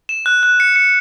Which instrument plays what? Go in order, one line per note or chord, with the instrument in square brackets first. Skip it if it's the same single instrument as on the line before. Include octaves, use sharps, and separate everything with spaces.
[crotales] E7
F#6
F#6
C#7
C#7